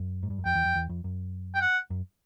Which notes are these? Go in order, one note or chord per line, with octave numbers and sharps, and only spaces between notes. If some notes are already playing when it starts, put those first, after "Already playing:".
Already playing: F#2
G#2
G2
F#2
F2 G5
E2
F2
E2
F2
F#2
G5
F#5
F#2